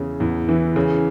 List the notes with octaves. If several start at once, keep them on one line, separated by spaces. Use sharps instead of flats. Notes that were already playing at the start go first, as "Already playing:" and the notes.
Already playing: E2 C#3
E2
E3
C#3